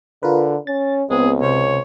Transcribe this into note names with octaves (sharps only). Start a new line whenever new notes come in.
D3 F4 A#4 B4
C#4 A6
C#2 B3 C4 G#4
C3 C5 C#5